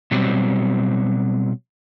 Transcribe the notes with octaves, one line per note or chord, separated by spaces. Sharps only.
B2 F#3 G3 C4